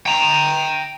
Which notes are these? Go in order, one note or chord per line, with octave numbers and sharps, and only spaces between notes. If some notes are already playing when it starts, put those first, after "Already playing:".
G5 A#5